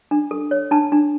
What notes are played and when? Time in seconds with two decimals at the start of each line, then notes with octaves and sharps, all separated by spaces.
0.11 D4
0.31 A4
0.51 C#5
0.71 D4 A5
0.92 D4